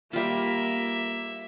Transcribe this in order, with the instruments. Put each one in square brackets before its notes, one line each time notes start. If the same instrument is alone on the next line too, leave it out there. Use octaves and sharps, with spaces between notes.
[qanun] G3 F4 [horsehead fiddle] A#3 [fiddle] E5